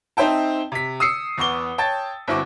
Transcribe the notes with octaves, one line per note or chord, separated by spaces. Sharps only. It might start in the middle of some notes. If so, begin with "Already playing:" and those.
C4 D#4 C5 E5 G5 A5
C3 B6
D#6 E6 C7 C#7
E2 B3 C#6 D6 G7
C#5 G5 A5 A6
G1 C4 E4 F#4 C#6 D6